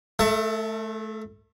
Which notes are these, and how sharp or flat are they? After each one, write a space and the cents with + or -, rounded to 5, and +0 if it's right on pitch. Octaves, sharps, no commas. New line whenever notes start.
A3 -25 A4 +35 E5 +30